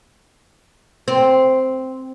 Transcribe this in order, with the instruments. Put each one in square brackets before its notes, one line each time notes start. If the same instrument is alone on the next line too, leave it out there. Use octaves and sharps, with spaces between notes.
[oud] C4